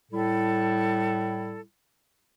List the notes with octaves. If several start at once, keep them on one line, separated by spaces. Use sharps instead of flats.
A2 G3 E4 A4